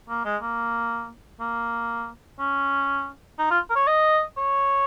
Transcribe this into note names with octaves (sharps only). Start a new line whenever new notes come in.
A#3
G#3
A#3
A#3
C#4
D#4
F4
A#4
C#5
D#5
C#5